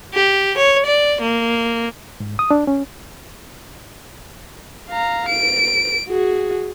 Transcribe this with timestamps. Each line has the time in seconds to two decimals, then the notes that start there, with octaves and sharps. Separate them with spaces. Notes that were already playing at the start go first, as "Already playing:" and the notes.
0.14 G4
0.57 C#5
0.86 D5
1.21 A#3
2.20 G#2
2.39 D#6
2.51 D4
2.67 C#4
4.89 F5 A#5
5.28 D7
6.09 F#4 G#4